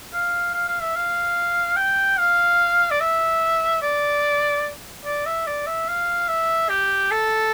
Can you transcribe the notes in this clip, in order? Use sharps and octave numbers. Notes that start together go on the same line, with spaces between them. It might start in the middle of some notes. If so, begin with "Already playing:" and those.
F5
F5
F5
E5
F5
G5
F5
D5
E5
D5
D5
E5
D5
E5
F5
E5
G4
A4